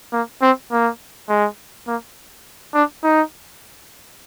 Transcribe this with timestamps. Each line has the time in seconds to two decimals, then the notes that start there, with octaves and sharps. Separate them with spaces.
0.13 A#3
0.42 C4
0.72 A#3
1.29 G#3
1.87 A#3
2.74 D4
3.04 D#4